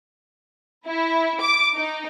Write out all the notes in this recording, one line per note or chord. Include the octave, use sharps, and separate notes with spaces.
E4
D6
D#4